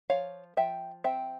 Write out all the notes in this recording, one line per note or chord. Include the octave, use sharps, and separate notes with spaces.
F3 C#5 F5
F3 E5 G5
C4 E5 G5